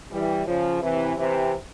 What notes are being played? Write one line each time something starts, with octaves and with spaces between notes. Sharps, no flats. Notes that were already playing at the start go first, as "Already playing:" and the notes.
E3 G3
C#3 F3
C3 E3
C3 E3